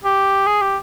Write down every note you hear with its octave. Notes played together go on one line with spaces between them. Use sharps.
G4
G#4
G4